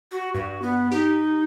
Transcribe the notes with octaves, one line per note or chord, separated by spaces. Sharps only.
F#4
G2 F#4
B3
D#4 G4